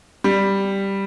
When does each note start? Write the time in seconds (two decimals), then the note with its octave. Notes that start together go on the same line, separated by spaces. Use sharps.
0.24 G3